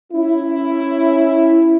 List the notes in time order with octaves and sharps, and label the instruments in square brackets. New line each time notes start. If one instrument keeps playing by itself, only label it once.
[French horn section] C#4 E4